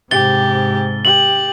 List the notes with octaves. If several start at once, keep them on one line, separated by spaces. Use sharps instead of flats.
G#2 C3 G4 A6 G7
G4 F#7